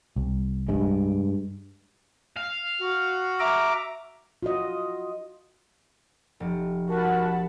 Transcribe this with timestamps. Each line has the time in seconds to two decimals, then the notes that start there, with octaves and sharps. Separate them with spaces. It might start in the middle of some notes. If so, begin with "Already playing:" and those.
0.16 C2
0.68 G2 G#3
2.37 F5
2.80 F#4
3.40 E5 A#5 D6
4.43 F4 F#4 D#5
6.40 F1
6.89 F#4 A#4 F#5 A5 B5